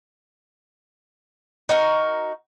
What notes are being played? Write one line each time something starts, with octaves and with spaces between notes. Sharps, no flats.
D#4 F#4 A#4